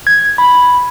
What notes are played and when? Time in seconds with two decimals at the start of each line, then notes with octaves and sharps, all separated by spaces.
0.07 G#6
0.38 B5